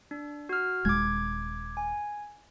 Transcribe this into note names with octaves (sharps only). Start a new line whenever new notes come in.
D4
F#4 F6
D#1 G#3 D6 G#6
G#5